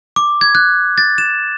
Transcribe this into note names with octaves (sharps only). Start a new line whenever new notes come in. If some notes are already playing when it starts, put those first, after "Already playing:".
D6
G#6
F#6
A6
E7